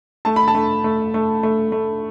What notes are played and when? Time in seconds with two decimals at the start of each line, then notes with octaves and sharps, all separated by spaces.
0.25 A3 A5
0.36 B5
0.48 A5
0.55 A3
0.84 A3
1.14 A3
1.43 A3
1.72 A3